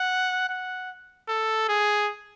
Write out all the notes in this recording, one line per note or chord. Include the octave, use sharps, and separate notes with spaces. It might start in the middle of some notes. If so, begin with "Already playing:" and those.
Already playing: F#5
F#5
A4
G#4